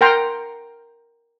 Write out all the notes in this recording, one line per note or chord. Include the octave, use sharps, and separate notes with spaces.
A#4 F#5 G5 A#5 C6